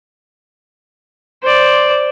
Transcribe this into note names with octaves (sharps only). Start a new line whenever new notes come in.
C5 D5